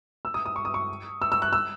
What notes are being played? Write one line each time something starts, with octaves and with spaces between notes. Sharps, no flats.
E6
D#6
D#6
C#6
D#6
C#6
E6
E6
F#6
E6